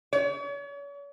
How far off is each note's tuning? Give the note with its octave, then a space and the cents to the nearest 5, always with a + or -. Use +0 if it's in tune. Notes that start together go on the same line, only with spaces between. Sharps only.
C#5 +40